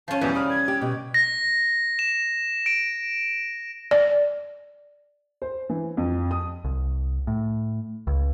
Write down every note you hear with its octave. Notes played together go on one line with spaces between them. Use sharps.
F3 C#4 A5
E2 B2 E3 G3
D5 B5 D#6 F6
G#6
G4
B2 G5
A#6
E7
D7
D5
C5
E3
F2
D#6
C2
A2
C#2